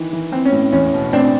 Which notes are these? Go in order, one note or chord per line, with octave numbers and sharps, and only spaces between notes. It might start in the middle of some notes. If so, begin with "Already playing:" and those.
Already playing: D#3 E3
E3
E3 C4
C#4
A2
E2 C#4
B2
A2 C4 D4